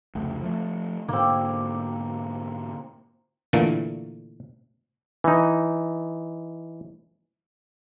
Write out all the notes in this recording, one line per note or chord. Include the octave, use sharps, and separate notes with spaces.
F1 C#2 A3
F3 A3
G#2 B2 D3 A#3 C4
A#2 D3 E3 A3 A#3
E3 D#4